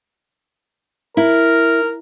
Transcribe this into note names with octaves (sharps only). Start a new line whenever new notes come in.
E4 A#4